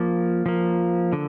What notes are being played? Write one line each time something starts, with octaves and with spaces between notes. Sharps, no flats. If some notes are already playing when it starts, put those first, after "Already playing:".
Already playing: F3 A#3
F3 A#3
D3